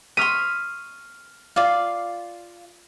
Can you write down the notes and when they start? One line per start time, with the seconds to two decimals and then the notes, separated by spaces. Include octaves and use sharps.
0.17 C6 C#6 D#6 F6 B6 D#7
1.56 F4 D5 F5